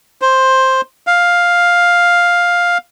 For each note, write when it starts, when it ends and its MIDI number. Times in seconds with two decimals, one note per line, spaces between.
0.22 0.81 72
1.07 2.78 77